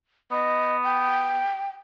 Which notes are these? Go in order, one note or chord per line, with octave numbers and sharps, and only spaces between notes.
B3 D#5
G5